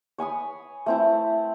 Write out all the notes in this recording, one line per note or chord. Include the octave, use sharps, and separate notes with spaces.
C#5 G#5 B5 D#6
A3 C4 E4